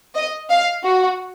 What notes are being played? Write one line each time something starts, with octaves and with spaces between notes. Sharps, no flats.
D#5
F5
F#4